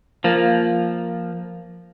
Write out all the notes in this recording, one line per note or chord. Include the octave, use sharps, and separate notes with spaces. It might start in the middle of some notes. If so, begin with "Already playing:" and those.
F3 A#3